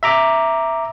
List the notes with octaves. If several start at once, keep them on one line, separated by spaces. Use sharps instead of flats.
E5 A#5 D6